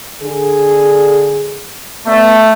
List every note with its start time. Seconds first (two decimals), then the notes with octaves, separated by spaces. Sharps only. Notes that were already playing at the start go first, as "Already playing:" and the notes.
0.22 D3 G#4
2.07 A3 B3 D5